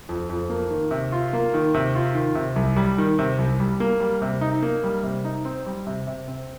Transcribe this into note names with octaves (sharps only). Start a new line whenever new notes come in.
F2
F2
A#3
D#3
C3
F4
A#3
D#3
C3
F4
D#3
C3
C2
G3
D#3
C3
C2
G3
A#3
G3
C3
D#4
A#3
G3
C3
D#4
C4
G3
C3
C3
C4